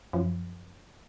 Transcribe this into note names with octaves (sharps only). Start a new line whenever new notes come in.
F#2 F3